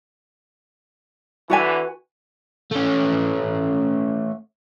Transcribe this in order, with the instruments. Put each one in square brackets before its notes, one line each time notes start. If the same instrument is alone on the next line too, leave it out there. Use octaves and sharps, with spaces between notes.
[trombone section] D3 E3 [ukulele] F#4 B4 G#5
[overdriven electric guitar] A3 C#4